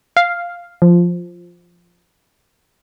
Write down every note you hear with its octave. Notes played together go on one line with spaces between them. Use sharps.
F5
F3